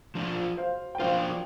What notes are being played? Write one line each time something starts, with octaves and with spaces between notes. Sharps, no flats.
F3 D4 F4
C5 F5
G5
F3 D4 F4 C5 F5